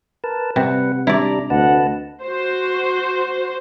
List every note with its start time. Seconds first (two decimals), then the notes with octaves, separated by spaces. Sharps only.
0.24 A#4 B4 A5
0.56 C3 G3 B4 F#5
1.07 G3 D4 E4 D5 A#5
1.50 D2 B4 D#5 F#5 A5
2.21 F#4 C5